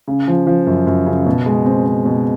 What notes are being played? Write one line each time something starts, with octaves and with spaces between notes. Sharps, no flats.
C#3
F3
F3
F#2
F#2
C#3
B2
G#3
C4
C4
B2